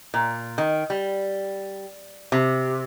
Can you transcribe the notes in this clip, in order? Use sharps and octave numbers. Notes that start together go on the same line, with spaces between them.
A#2
D#3
G3
C3